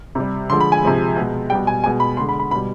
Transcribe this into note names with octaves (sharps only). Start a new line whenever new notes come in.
C3 G3
D3 F3 G#3 C6
B5
G#5
C3 F3 G#3
B2 G#3
G3 G5
B2
G#5
B2 G#3 G#5
B5
D3 G#3 C6
B5
B5
B2 G3 B5